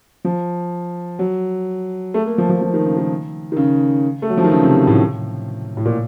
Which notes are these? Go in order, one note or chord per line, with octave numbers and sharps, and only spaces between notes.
F3
F#3
A3
A#3
F3
F3
F3
D#3
C#3
D#3
D#3
C#3
A3
F#3
F3
D#3
C#3
C3
A2
A2
A#2